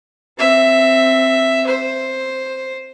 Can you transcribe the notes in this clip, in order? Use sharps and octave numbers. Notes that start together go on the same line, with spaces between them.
C4 E5
C5